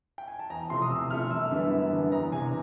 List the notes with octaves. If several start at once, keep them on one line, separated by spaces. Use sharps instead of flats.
G5
G#5
A5
E2 A#5
C3 F3 A3 C6
D#6
E2 E6
C3 F3 A3 F6
F#2 E6
D3 G3 B3 E4
F#2
D3 G3 B3 E4
E2 A#5
C3 E3 G#5